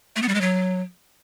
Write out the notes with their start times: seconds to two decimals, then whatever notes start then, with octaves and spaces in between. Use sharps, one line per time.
0.16 A3
0.22 B3
0.28 G3
0.35 G#3
0.41 F#3